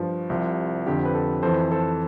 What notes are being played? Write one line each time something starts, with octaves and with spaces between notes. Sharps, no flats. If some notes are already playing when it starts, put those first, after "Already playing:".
Already playing: G2 F3
C2 C3 F3
F2 D3 F3 G4
B4
A4
F2 E3 A4 C5
A4 C5